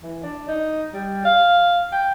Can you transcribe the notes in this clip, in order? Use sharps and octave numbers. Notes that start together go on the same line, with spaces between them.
E3
D4
D#4
G3
F5
G5